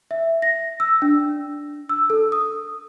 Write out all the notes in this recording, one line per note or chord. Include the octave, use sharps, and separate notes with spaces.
E5
A#6
E6
D4
E6
A4
D#6